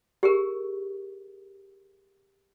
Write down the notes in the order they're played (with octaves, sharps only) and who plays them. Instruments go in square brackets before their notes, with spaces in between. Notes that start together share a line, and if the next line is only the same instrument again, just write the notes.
[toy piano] G4 G#4 A#4